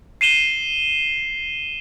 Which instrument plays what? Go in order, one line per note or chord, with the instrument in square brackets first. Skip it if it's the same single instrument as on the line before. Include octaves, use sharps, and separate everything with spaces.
[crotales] C7 D#7 E7 G7